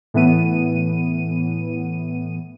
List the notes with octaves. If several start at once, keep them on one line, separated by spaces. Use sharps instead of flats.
A2 E3 B3 D#7